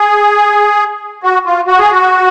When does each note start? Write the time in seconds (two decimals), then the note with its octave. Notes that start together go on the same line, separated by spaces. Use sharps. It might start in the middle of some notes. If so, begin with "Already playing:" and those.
Already playing: G#4
1.23 F#4
1.46 F4
1.67 F#4
1.79 G#4
1.91 F#4